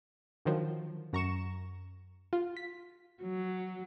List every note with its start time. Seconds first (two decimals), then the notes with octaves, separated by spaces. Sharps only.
0.45 D3 D#3 F3 F#3
1.13 F#2 A#5 C#6 E7
2.33 F4
2.57 B6
3.22 F#3